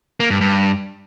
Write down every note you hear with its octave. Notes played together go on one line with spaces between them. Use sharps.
A#3
G2
G2